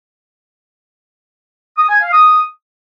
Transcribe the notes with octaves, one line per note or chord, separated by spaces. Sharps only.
D#6
G#5
F5
D#6